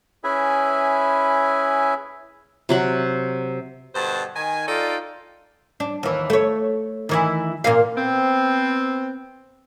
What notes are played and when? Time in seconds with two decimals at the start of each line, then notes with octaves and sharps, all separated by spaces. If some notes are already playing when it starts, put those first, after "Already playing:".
0.24 C#4 E4 G#4 B4 E5 G#5
2.69 C3 F#3 F#5
3.95 G2 B2 D3 C5 A5
4.35 D#3 G#5
4.67 D#4 F4 A4 D5 G5
5.80 D4
6.03 D#2 E3
6.30 A3 C#5
7.09 D#3 E3 E4
7.64 A#2 A#3 F5
7.95 B3 C4